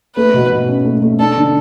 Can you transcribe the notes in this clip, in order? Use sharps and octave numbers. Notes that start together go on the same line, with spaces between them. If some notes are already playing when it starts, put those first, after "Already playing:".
A3 B4
B2
B2
C#4
A3
A3
D4 A4
D3